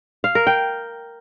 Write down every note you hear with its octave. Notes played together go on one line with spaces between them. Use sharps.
F5
A#4
G5